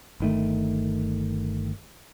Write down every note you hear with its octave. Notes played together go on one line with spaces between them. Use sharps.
G1 D#3 A3